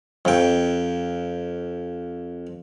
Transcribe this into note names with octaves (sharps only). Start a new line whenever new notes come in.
F2 G5